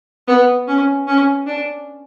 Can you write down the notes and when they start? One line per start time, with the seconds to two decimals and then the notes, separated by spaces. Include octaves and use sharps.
0.28 B3
0.67 C#4
1.07 C#4
1.47 D4